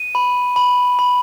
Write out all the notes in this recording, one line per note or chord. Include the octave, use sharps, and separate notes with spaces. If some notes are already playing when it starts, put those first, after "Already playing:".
Already playing: D#7
B5
B5
B5